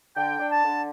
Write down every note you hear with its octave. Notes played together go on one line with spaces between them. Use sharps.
D3 G5
D4
A5
D3